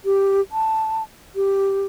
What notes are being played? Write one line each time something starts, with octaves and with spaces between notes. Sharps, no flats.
G4
A5
G4